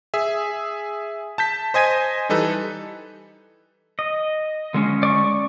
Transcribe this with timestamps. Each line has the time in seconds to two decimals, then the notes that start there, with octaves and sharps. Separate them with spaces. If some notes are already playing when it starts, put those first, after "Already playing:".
0.14 G#4 E5
1.38 A5 G6 B6
1.74 C5 D#5 G#5 G#6 B6 D#7
2.29 E3 G3 D#4 A4 B4
3.99 D#5
4.74 D3 G#3 C#4
5.03 D5 C#6